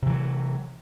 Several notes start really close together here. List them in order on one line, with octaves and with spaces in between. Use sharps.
C3 E3 F#3